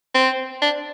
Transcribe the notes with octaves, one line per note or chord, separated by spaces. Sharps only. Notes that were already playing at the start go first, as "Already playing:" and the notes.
C4
D4